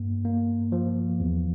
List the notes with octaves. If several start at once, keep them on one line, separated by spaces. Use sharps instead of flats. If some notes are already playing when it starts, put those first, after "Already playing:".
Already playing: G2 A#3
A#3
F3
E2